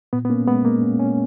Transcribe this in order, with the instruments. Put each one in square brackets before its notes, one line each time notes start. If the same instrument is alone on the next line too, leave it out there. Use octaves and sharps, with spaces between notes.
[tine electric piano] A#2 [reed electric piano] B3
[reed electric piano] B3
[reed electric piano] A#3 [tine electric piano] C#4
[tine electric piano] G#3 [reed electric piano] B3
[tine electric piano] G#3 [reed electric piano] A#3
[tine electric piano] C#4
C#4